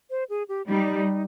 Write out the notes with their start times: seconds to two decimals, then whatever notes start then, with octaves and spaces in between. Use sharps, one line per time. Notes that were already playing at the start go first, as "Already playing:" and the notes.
0.10 C5
0.30 G#4
0.49 G4
0.68 G3 D#4